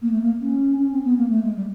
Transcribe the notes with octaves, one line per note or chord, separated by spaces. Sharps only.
A#3
A3
A#3
C#4
C#4
C4
B3
A#3
A3
G#3
G3